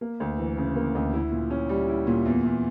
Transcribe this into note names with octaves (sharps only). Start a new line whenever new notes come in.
A#3
D2
E3
C#3
A#3
D2
E4
A#2
C#4
G3
E4
A#2
E2
E2